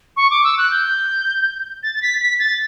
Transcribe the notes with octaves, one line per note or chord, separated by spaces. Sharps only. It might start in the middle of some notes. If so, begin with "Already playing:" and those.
C#6
D6
E6
F#6
G6
A6
A6
B6
B6
A6